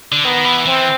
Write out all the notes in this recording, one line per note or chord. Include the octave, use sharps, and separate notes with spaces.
D3
D#3 B3
E3
E3 C4